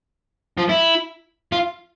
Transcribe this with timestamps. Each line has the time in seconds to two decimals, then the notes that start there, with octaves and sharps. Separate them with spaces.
0.58 F3
0.69 E4
1.52 F4